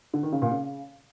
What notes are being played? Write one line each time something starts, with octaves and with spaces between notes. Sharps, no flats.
D3
D#3
C#3
A#2
C#3